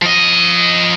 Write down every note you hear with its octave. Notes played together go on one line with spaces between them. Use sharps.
F3 D#5